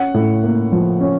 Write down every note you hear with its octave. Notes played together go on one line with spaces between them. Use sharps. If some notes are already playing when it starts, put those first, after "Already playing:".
Already playing: C#4 F#5
A2
A#3
F3
C#4